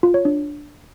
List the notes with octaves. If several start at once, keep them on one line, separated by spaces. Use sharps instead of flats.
F4
C#5
D4